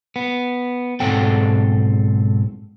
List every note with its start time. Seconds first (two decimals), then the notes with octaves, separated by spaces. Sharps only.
0.16 B3
1.00 B1 G#2 C4 A4 F#5 G5